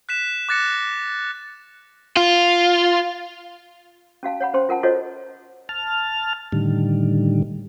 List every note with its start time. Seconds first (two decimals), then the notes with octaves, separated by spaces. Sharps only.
0.09 F#6 B6 E7
0.49 D6 F#6 A6 A#6 C#7
2.17 F4
4.23 C#4 F#4 F5 A5
4.40 C#5 F#5 B5
4.54 C#4 C5 G5 C6
4.69 F4 A#4 F#5 A5
4.83 F4 F#4 A4 C5 C#5 D#5
5.69 A5 F6
6.52 A2 D3 D#3 G3